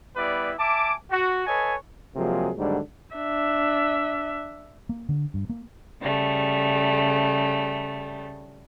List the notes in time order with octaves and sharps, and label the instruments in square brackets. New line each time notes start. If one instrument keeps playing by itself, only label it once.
[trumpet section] G3 B3 E4 B4 D5
E5 G#5 A5 D6
F#4
A4 B4 C#5 D#5 G#5
[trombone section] C3 F3 F#3 G#3 A#3 G#4
D#2 G#2 D3 F#3 G3 D4
[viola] D4 E5
[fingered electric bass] A#3
D3
G2
A#3
[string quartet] C#3 G3 A3